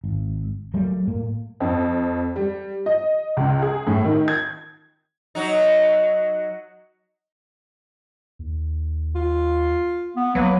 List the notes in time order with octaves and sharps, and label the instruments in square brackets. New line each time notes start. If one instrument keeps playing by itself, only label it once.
[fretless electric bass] G#1
F#3 G3 A3 A#3
A2 A#3
[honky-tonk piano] F2
G3
D#5
C#2
G#4
A2
D#3
G#6
[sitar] F#3 D#4
[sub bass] D#2
[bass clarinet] F4
[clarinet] B3
[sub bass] C2 [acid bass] F#3 [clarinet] A#3 [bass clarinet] B4